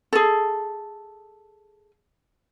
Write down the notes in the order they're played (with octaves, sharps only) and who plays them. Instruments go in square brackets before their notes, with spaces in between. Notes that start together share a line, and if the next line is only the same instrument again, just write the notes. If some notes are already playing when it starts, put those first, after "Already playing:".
[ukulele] G#4 A4